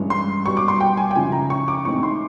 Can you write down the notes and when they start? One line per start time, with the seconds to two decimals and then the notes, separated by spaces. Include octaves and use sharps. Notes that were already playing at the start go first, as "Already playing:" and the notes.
Already playing: G2 E3 G#3 C#4
0.10 C6
0.45 B2 G3 B3 C#6
0.57 D6
0.68 C6
0.80 G5
0.97 G#5
1.11 G5
1.15 C#3 F3 G#3 C#4 E4 G#5
1.32 A#5
1.50 C#6
1.68 D6
1.85 A2 E3 G#3 C4 D#4 C#6
2.03 C6